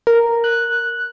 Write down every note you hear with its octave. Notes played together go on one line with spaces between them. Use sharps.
A#4
F#6